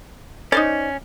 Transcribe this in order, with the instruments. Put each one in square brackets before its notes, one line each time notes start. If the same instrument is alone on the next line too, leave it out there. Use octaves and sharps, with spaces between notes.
[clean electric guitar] C#4 [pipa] D#4 C5 D5